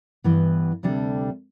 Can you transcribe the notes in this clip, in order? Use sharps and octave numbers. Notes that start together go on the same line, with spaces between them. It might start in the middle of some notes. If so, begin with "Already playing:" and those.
G2 E3 B3
D2 C3 G3 D4 A4